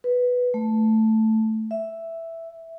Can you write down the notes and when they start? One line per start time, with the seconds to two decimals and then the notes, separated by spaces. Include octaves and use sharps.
0.04 B4
0.54 A3
1.71 E5